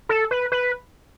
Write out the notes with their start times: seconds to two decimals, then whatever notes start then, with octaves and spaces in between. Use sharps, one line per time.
0.09 A4
0.31 B4
0.52 B4